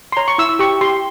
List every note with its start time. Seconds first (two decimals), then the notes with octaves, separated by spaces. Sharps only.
0.12 C6
0.17 C#5 A#5
0.28 C#6
0.38 E4 E6
0.49 E6
0.59 G4 C#6
0.81 G4 C6